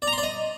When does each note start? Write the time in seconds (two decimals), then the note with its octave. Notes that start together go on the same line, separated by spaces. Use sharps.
0.02 D5
0.07 A#5
0.13 C6
0.18 D5
0.23 D#5